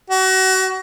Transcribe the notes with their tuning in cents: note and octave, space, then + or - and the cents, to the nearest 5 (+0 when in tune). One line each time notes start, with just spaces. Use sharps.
F#4 +30